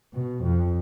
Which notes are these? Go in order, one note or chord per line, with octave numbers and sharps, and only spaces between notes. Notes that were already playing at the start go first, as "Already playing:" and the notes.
B2
F2